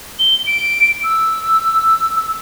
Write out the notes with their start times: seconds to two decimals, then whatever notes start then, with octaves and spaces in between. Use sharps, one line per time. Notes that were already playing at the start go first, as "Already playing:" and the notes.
0.19 G7
0.46 D7
1.04 E6
2.15 E6